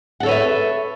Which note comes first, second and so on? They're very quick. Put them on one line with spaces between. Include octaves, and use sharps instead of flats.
F#5 A4 C#5 B4 E5